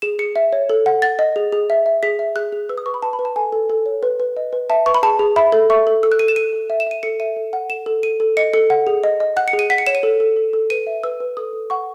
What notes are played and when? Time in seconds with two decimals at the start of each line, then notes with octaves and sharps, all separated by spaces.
0.02 G#4 E7
0.19 G#4 C#7
0.36 E5
0.53 C#5
0.69 A4
0.86 F#5
1.02 F#5 A6
1.19 D#5
1.36 G#4
1.52 G#4
1.70 E5
1.86 E5
2.03 G#4 B6
2.19 E5
2.36 G#4 F#6
2.53 G#4
2.69 B4 E6
2.78 D#6
2.86 B4 C#6
2.94 B5
3.02 B4 A5
3.13 B5
3.19 B4
3.25 A5
3.36 A4 G#5
3.52 A4
3.70 A4
3.86 C#5
4.03 B4
4.20 B4
4.37 D#5
4.53 B4
4.70 E5 A5
4.86 B4 C#6
4.94 B5
5.03 G#4 A5
5.19 G#4
5.36 E5 B5
5.52 A4
5.70 E5 C#6
5.87 A4
6.03 A4 E6
6.12 F#6
6.19 A4 D#7
6.28 E7
6.36 A4 D#7
6.53 A4
6.70 E5
6.80 E7
6.87 E5 D#7
7.03 A4 C#7
7.20 E5 D#7
7.36 A4
7.53 F#5
7.70 A4 E7
7.86 A4
8.03 A4 D#7
8.20 A4
8.37 D#5 C#7
8.53 A4 C#7
8.70 F#5
8.87 G#4
9.04 D#5
9.20 D#5
9.37 F#5 F#6
9.48 C#7
9.53 G#4
9.59 D#7
9.70 F#5 B6
9.78 C#7
9.87 C#5 E7
9.95 D#7
10.03 A4
10.20 A4
10.37 A4
10.53 A4
10.70 B4 D#7
10.87 E5
11.03 B4 E6
11.20 B4
11.37 A4 D#6
11.53 A4
11.70 F#5 C#6